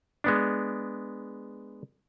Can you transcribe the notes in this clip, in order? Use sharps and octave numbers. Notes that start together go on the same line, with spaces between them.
G#3 B3 D4